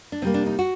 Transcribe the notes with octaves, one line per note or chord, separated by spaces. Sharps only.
D4
C3 G3 A#3 C4
D4
D#4
F#4